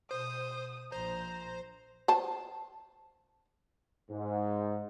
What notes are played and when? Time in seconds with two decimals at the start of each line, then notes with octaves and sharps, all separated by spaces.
0.11 B2 C5 D#6
0.92 A#1 C5 A#5
2.08 C5 A5
4.10 G#2